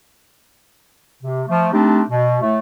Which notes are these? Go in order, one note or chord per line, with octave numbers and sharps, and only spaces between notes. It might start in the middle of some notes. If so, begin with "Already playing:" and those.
C3
F3 A3
A3 C4 D4 D#4 G4
B2
A2 A3